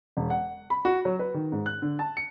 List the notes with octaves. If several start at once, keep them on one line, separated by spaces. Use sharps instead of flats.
E1
F#5
B5
F#4
F#3
B4
D#3
G#2
F#6
D3
A5
C#7